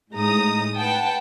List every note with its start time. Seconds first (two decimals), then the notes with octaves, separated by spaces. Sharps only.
0.13 A2 G#3 D#4 A#5 D#6
0.76 B4 F#5 G5 A5